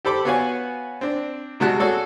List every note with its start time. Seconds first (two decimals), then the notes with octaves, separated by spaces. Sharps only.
0.05 G4 A4 C5 B5 D6
0.25 B3 F#4 C#5 F5 F#5 G#5
1.01 C4 D4
1.60 C3 G3 G#3 F#4 A5 F#6
1.79 F#4 G#4 A4 C#5 D5